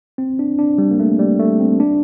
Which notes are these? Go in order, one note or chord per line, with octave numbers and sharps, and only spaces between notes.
C4
D4
D4
G3
A#3
A3
G3
A3
C4
D4